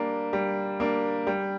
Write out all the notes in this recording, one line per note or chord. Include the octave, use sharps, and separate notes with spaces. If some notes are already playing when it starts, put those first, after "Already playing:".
Already playing: G3 A#3 D4
G3
A#3 D4
G3